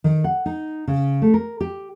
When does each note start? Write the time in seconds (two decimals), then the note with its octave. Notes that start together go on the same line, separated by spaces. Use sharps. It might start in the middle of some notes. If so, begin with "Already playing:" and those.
0.04 D#3
0.24 F#5
0.46 D#4
0.88 C#3
1.22 A3
1.34 A#4
1.61 G4